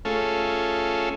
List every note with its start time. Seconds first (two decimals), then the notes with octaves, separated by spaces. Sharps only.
0.05 A3 C#4 F4 G#4 A4